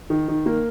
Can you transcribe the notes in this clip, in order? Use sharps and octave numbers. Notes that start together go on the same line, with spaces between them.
D#3
D#3
A#3